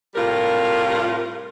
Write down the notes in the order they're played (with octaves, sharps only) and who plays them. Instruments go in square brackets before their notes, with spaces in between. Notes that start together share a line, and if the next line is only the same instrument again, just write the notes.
[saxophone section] A2 C3 G3 F4 A#4